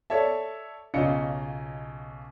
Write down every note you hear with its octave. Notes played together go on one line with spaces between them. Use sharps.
A4 C#5 D5 E5 A5
B1 C#3 F4 D#5 C#7